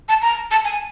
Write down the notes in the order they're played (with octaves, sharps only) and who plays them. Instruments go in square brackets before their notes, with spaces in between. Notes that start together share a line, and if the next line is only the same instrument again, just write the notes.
[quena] A5
A#5
A5
G#5